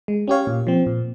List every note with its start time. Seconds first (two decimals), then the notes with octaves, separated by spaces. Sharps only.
0.08 G#3
0.28 C#4 G4 C#5 F5
0.47 A#2
0.67 F3 C4
0.87 A#2